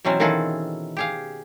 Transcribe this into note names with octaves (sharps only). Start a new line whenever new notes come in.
B2 E3 F#3 C4 C#4
D#3 E3 F4 F#4 G#4 A4
G4 G#4 F5